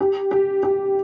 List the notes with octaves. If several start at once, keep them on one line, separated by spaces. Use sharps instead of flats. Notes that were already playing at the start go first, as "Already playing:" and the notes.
G4
G4
G4